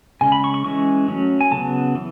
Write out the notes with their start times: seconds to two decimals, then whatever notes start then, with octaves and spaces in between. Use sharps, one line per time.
0.21 C#3 G#3 C#4 G#5
0.32 B5
0.44 C#6
0.54 C#6
0.65 E3 G#3 C#4 C#6
1.08 F#3 A3 C#4
1.41 G#5
1.52 C#3 F#3 B3 A5
1.95 E3